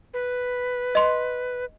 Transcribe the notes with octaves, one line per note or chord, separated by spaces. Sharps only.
B4
D#5 C6